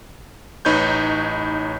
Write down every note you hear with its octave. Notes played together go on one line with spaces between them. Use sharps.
A1 D#4 B4 C#5 G6